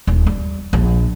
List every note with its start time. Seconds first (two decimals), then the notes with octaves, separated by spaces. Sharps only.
0.07 D#1
0.27 G3
0.73 A#1